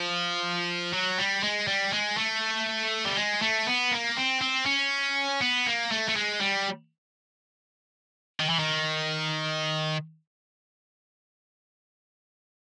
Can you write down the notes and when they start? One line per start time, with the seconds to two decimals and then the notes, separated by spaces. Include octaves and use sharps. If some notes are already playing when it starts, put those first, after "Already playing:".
Already playing: F3
0.93 F#3
1.18 G3
1.43 G#3
1.67 G3
1.93 G#3
2.17 A3
3.05 G3
3.16 G#3
3.42 A3
3.67 B3
3.91 A#3
4.17 C4
4.41 C4
4.66 C#4
5.41 B3
5.67 A#3
5.91 A3
6.09 A3
6.16 G#3
6.41 G3
8.40 D#3
8.50 E3
8.59 D#3